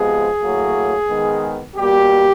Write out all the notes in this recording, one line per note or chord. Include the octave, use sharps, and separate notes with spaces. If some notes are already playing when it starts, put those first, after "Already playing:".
Already playing: C3 F3 G#3 B3 G#4
A2 F#3 A#3
D#3 G#3 B3
B2 G3 A#3 G4